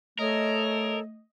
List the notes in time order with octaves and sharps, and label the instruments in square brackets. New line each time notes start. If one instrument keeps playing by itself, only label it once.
[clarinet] A3 [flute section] A4 C#5 [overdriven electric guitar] A#4 [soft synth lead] D#5